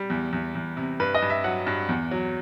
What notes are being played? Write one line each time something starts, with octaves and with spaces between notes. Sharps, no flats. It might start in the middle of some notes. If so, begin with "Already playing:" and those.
Already playing: G3
E2
E2
E2
C3
G2 B4
D#5
G2
E5
F#3 F#5
G2
E2
F#3